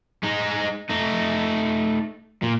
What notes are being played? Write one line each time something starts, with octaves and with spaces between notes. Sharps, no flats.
G#3 D#4
A3 D#4
A#2